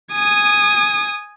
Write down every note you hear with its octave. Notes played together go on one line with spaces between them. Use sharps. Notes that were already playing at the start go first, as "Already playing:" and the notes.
G#5 D#6